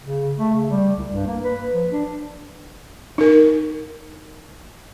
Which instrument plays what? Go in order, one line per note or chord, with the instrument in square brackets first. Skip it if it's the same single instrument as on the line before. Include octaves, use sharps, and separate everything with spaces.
[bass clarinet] C#3
A3
C#3
G3
C2
G2
A#3
B4
F3
D4
[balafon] D#4 A#4